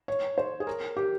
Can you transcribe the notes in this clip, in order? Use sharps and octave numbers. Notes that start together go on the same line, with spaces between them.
C#5
C5
G#4
A#4
G4